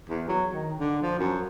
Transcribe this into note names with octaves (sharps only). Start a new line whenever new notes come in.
E2
F#3
D#3
D3
F3
F#2